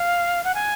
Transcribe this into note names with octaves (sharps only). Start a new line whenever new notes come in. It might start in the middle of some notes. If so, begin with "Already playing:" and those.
Already playing: F5
F#5
G#5